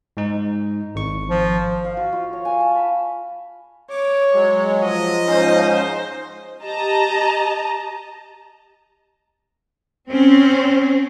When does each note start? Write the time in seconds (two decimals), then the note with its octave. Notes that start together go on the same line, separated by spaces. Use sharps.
0.17 G#2 D#4
0.95 G#1 C#6
1.30 F3
1.85 F5
1.97 F#4
2.13 F4
2.33 C#5
2.45 G#5
2.60 A5
2.75 B5
3.90 C#5 D6
4.33 F#3 G#3
4.82 F3 D#5
5.26 G#2 C#4 D#4 C5
6.63 G4 D#5 A5 A#5
10.08 C4 C#4